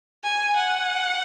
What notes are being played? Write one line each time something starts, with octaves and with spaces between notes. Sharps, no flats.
G#5
F#5